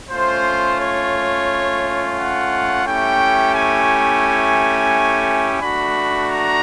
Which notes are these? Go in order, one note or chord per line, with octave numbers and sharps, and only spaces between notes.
A3 C#4 F4 C5
C#5
F#5
A3 C#4 E4 G4 G5
G#5
A3 D4 F#4 B5
A#5